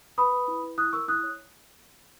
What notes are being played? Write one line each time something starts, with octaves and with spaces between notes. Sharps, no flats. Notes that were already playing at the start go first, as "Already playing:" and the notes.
B4 B5 D#6
B4
E4
E4
E4 D#6 F#6
A#4 C#6 E6
E4 D#6 F#6
C#5